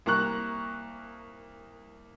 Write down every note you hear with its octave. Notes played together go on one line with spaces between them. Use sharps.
C2 A#3 A#5 C#6 F#6